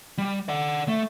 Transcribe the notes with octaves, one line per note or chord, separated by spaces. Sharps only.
G3
D5 F#5
A3